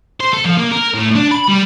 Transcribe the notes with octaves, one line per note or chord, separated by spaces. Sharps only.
C5
A4
F3
A#3
A#4
A2
D4
B5
G3